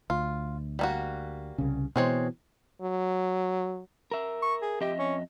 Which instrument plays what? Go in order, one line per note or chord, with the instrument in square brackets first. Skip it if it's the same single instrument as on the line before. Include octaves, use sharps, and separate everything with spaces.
[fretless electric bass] D2 [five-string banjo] F4
[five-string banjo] G3 A#3 F#4
[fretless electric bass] C2 C#3
[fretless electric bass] B2 E3 [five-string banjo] G#3 C4 C#5
[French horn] F#3
[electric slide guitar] A#4 E5
[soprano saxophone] C#6
G#4
[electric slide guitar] F2 D#5 E5 [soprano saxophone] G4
[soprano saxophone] C#4